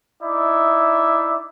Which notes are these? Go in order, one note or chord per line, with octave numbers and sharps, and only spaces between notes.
D#4 E4 D5 E5